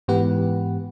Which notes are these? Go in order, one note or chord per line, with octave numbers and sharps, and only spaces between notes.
G#2 E3 B3 G4 B4 F#5